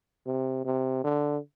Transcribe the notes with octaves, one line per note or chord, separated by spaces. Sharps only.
C3
C3
D3